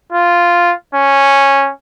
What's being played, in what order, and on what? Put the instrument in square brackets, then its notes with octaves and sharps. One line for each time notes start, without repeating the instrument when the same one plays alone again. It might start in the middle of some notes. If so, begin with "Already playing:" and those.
[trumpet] F4
C#4